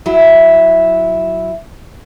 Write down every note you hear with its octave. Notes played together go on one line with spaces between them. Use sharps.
F#3 E4